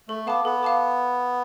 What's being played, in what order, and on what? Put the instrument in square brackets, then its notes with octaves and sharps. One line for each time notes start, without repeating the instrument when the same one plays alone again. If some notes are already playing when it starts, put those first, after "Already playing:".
[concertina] A3 [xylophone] A4
[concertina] B3 [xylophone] F5 A5 D6
[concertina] B3 [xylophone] A4
[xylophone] F5 A5 D6